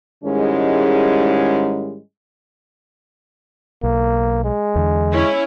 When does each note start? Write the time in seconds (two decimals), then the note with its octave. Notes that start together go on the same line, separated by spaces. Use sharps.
0.23 G#2 D#3 G3 G#3 C#4 E4
3.83 B1 A#3
4.44 G#3
4.76 E2 D3
5.12 C#4 E4